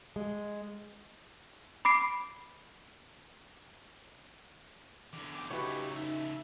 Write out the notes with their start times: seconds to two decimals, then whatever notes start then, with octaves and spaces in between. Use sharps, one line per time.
0.16 G#3
1.85 B5 D6 C7 D7
5.13 E2 D3 D6
5.35 G5 D6
5.51 C#3 A3 D#4 E4 F#4 G4 B4 C#5
5.96 D#4 E5